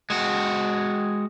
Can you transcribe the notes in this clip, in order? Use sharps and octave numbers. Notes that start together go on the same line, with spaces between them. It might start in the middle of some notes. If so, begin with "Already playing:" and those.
G#3 F#4